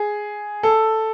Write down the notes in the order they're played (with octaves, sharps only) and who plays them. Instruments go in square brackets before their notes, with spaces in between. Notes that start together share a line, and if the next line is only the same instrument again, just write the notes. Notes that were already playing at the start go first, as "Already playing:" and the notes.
Already playing: [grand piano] G#4
A4